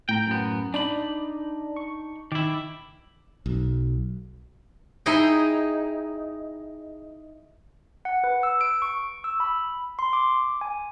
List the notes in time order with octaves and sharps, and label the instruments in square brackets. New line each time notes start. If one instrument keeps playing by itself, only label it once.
[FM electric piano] A2 A#5 [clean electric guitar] G5
[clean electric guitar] F#2 B3
[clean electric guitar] D4 D#4 B5 [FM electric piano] D5
[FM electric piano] C#6
[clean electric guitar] D#3 E4 [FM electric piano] D6
[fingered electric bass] B1
[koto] D#4 E4 G#4 D#5 G5
[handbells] F#5
B4
E6
D7
C#6
E6
B5
C6
D6
G#5